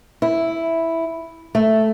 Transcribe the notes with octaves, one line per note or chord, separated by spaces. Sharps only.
E4
A3